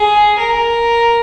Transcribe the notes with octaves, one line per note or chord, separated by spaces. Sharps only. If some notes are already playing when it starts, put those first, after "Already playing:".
Already playing: G#4
A#4